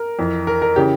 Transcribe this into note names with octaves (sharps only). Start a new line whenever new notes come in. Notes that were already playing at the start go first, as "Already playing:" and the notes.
Already playing: A#4
F2 E3
A#4
A#4
C#3 E3 G4